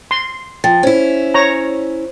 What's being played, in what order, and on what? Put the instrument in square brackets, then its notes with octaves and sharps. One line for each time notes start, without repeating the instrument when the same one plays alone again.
[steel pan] C6
[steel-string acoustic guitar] F3 [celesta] G5 A6
[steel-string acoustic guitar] C#4 E4 [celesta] C5
[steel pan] C#5 A#5